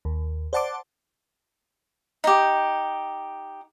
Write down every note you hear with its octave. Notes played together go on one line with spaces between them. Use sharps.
D#2
C5 D5 F#5 A5 C6 D6
D#4 G4